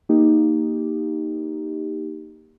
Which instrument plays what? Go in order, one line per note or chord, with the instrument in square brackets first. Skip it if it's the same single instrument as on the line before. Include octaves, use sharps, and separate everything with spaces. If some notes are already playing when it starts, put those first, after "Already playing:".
[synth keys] A#3 D#4 G4